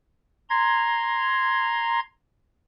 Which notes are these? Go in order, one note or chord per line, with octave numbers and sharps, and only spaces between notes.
A#5 C6 G#6